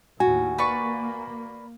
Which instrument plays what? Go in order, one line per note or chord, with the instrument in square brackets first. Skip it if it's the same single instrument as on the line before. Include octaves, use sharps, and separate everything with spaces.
[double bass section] D#2 A2 [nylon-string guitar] F#4 [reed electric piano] G#5
[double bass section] A#3 [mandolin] B4 D5 C#6